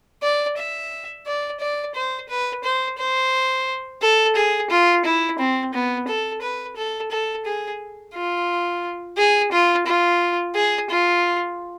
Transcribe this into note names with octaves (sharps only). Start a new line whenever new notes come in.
D5
E5
D5
D5
C5
B4
C5
C5
A4
G#4
F4
E4
C4
B3
A4
B4
A4
A4
G#4
F4
G#4
F4
F4
G#4
F4